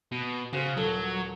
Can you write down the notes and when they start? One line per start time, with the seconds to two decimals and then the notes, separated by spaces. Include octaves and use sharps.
0.12 B2
0.53 C#3 F#4 C5
0.77 D#1 F#3 A4